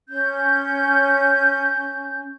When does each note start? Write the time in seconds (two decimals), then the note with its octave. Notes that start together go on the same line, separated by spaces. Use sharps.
0.09 C#4 G6